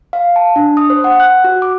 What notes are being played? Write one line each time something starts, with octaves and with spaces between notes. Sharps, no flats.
F5
A5
D4
D#6
C5
F#5
F#6
F#4
D6